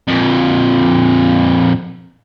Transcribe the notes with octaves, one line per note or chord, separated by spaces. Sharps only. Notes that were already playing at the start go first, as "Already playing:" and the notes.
F2 A#2